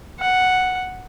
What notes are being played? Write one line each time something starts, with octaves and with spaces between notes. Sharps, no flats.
F#5